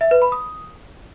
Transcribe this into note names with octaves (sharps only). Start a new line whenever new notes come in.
E5
B4
B5
D#6